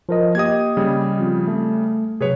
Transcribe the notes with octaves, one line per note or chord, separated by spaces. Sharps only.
F3 A#4 D#5
A#3 G4 D#5 D#6 G#6
C#3 G3
F3 C4 F4
A3
C3 F#3 G#4 B4 C#5